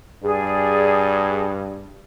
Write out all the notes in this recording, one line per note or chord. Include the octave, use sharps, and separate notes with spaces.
G2 G#4 D5